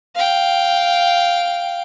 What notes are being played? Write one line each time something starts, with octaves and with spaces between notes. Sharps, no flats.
F5 G5